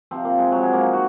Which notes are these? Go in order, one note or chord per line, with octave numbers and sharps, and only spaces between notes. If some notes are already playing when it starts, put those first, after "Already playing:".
C3 F3 C4
A#3
G#3
F#3
G#3
A#3
D#4
F#4